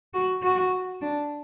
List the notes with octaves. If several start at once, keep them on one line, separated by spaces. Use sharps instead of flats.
F#4
F#4
D4